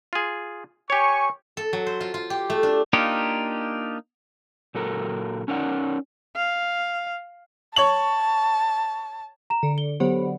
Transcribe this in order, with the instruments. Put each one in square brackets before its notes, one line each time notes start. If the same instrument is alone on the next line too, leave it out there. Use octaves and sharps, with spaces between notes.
[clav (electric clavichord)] F4 G#4
[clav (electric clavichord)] G4 C#5 [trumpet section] G#5 C#6
[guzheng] A4
F#3
C5
F4
F4
G4
A3
D4
[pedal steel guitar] A#3 D4 D#4 F4 G4
[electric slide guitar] A#2 F#3 A4 A#4
C#4 D#4 A#4 C#5 D5 F#5
[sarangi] F5
[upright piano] C#5 C#6 F#7 [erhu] A5
[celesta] A#5 E7
[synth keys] D3
[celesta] G7
[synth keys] D3 F#3 B3 [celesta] G4 C5